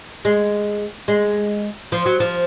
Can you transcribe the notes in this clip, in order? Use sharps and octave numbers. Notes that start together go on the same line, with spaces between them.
G#3
G#3
F3
F#3
F3